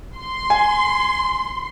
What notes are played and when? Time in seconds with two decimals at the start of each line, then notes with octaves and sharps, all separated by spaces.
0.17 C6
0.50 G#5